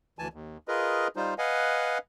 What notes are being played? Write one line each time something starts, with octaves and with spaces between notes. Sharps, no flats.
D2 E3 G#5 A5
D#2
F4 G#4 A#4 B4 D#5
G3 D#4 F4 C5
B4 D#5 F5 F#5 G#5